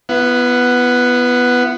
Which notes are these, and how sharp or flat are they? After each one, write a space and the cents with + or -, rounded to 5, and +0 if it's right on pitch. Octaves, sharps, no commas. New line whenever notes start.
B3 +0 E4 +45 F#5 +0